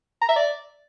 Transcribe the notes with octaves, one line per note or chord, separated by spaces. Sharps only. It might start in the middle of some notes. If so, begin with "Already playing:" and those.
A#5
E5
D5